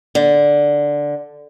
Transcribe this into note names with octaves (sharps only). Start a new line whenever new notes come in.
D3